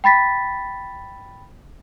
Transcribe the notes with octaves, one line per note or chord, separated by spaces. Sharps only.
G5 B5 A6 B6